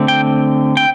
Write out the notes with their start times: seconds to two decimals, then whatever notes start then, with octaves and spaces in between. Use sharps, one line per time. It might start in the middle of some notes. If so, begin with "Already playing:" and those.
Already playing: D3 A3 C4
0.08 G5
0.77 G5